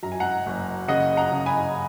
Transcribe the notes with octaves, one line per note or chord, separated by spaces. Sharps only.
F#2 A#5
G#5
F#5 A#5
F#1
C#3 D#5 F#5
F#5 A#5
C#3
G#5 B5